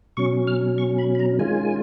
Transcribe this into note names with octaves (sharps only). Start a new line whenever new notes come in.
B2 F#3 C#4 C#6
F6
C#6
B5
B5
A#5
D#3 G#3 C#4 F4 G#5